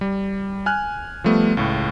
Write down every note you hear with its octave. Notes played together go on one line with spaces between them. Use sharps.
G3
G#5 F6 F#6
F3 G3 A3 B3
C#2 A2